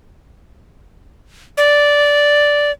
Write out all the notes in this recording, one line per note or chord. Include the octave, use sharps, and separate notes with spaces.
D5